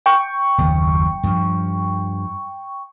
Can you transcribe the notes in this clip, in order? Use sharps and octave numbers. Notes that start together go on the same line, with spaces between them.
G5 C#6
F#1 D#2
G2 F3